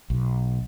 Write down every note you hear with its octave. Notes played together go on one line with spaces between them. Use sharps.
B1